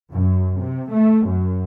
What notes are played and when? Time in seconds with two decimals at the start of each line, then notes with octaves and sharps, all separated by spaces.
0.11 F#2
0.59 C3
0.92 A3
1.26 F#2